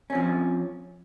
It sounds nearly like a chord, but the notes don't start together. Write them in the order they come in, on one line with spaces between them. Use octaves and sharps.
C#4 C4 F3